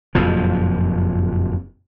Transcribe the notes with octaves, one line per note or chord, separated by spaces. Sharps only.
F#1 F2 A#2 F3